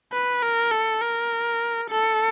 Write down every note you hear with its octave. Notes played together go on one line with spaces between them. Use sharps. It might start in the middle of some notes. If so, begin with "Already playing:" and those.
B4
A#4
A4
A#4
A4